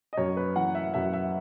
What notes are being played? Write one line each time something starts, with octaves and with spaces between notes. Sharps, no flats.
D#5
F#2 C#5
B4
E3 F#5
E5
F#2 E5
E5